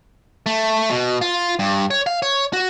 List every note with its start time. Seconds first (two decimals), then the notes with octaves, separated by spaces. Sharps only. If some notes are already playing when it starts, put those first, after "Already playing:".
0.46 A3
0.90 B2
1.21 F4
1.59 G2
1.91 C#5
2.07 F5
2.22 C#5
2.53 F#4